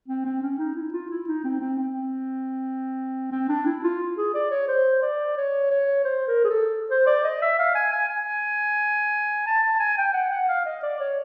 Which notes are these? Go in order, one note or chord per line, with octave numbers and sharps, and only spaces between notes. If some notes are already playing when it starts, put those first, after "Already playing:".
C4
C4
C#4
D#4
E4
F4
E4
D#4
C4
C4
C4
C4
D4
E4
F4
G#4
D5
C#5
C5
D5
C#5
C#5
C5
A#4
G#4
A4
C5
D5
D#5
E5
F5
G#5
G#5
G#5
A5
A5
G#5
G5
F#5
F#5
F5
D#5
D5
C#5